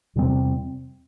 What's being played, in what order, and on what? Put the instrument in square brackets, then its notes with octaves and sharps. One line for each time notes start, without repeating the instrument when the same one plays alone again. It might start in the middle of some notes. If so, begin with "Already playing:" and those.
[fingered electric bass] E2 C3 G3 C4